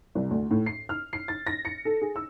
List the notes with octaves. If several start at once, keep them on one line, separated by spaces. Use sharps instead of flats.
C2
D2
A2
C7
F6
C7
A6
A#6
C#7
A4
G#4
E6